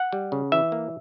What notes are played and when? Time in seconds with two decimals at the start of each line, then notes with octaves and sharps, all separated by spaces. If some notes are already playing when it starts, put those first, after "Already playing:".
Already playing: F#5
0.12 G3
0.32 C#3
0.52 E3 E5
0.72 A#3